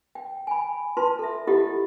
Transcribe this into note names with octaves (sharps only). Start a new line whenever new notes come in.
G5
G#5 B5
F4 B4 A5 C6
A4 E5
E4 F4 G4 A4 D#5 F#5